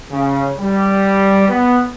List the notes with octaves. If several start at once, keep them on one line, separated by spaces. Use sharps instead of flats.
C#3
G3
B3